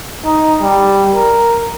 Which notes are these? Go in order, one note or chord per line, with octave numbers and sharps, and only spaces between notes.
D#4
G3
A#4